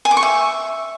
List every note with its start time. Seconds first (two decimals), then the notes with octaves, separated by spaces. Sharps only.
0.05 G#5
0.11 D6
0.17 C#6
0.23 E5